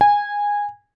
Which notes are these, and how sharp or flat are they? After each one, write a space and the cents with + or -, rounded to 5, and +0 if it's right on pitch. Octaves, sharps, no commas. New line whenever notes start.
G#5 -15